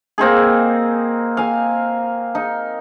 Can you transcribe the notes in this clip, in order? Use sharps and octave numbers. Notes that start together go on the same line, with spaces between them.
A#3 C4 D#4 G#4
F5 G#5
D#4